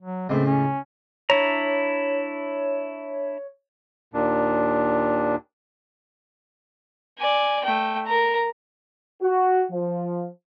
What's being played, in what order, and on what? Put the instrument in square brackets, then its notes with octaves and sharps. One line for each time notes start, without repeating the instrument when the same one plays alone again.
[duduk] F#3
[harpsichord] C#2 A2 [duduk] C4
[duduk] C#4
[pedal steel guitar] D4 E4 A#5 [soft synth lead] C#5
[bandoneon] D#2 A#2 D4
[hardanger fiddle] D5 G#5
A3 G5
A#4 A#5
[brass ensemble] F#4
F3